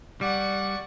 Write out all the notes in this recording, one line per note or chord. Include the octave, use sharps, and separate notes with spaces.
G3 D5 F#5 C#6